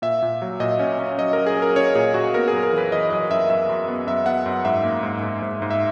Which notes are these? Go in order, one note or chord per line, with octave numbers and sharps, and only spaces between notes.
A#2 E5
A#2
F#3
A#2 D#5
C#4
C#4
F#3 D#5
F#3 A#4
G#4
C#4
A#4
C#4 C#5
A#2 G#4
A#2 F#4
B3 A#4
G#4
F#2
A#4
E3
B4
E3 D#5
F#2 D#5
F#2 E5
F#2 E5
F#2
B3
F#2 E5
B3 F#5
F#2
G#2 E5
A#3
G#2
G#2
G#2
G#2
E5